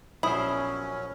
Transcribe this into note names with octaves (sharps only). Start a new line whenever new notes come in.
A#1 B2 F#3 C#4 E4 C5 B5 D#6